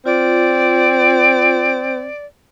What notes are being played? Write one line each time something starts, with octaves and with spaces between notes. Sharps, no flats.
C4 F4 D5